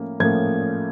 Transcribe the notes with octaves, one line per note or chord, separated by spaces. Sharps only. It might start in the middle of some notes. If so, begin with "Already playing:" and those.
Already playing: A2 F3 A#3 C#4
A2 F3 A#3 C#4 G#6